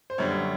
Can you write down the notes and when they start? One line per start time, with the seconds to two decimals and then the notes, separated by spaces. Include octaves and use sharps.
0.10 C5
0.18 F#2 D3 G3 C#5